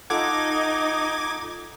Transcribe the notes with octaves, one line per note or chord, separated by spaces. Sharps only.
D#4 F4 A4 F#5 D6 G#6